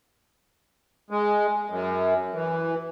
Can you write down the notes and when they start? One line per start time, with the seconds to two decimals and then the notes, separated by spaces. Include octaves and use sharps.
1.11 G#3
1.70 F#2
2.34 E3